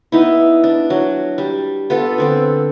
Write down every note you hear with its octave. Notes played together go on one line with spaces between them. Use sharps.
B3 D#4 E4
D4
F#3
G3
B3 F4 A4
D3 C4 A4